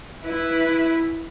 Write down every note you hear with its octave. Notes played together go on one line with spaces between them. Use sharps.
E4 B4